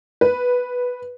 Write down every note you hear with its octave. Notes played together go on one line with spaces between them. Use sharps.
B4